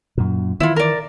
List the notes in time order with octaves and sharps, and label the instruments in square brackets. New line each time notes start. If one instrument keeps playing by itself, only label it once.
[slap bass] F#2 A#2
[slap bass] D#3 E3 [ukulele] E4 F4
[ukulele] A#4 D5